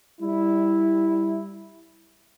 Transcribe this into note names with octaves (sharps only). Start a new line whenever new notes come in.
G3 E4